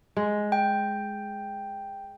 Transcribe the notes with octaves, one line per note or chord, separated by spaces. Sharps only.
G#3
G5